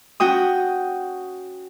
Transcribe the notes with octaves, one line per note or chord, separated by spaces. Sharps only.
C#4 F#4 G5 D#6